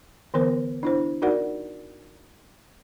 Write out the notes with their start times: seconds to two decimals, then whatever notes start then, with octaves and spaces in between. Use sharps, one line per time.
0.34 D3 E3 B3 A#4 C5
0.83 D4 E4 C5
1.22 D#4 F#4 A#4 D5 F#5